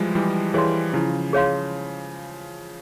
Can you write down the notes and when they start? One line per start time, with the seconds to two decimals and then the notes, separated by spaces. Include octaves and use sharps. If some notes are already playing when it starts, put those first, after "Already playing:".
Already playing: E3 F3 G3 G#3
0.15 E3 G3 E4
0.54 E3 G3 G#4 C#5 F5 C6
0.93 C#3 F3 E4
1.33 G#4 C#5 F5 C6